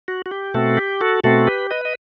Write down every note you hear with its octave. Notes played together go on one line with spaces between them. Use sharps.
F#4
F#4
G4
B2 A3 C4 F#4 A4
G4
F#4 A4
B2 A3 C4 F#4 A4
G4 B4
B4 D#5
D#5